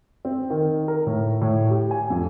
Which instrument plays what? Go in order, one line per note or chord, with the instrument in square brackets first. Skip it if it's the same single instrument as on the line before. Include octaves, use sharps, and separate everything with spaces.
[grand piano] C4
D#3
A#4
A2
A2
G4
G#5
F2